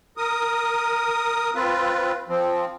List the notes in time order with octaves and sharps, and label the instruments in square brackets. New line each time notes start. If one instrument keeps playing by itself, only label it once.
[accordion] A#4 D#6
C4 F4 B4
F3 C4